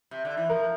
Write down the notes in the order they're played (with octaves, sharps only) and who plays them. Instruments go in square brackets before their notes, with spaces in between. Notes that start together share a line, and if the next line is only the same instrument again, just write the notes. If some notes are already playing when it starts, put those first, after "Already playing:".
[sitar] C3
D3
E3
[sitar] F3 [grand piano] A#4